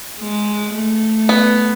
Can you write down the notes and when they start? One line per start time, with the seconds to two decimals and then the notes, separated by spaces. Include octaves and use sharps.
0.19 G#3
0.73 A3
1.29 B3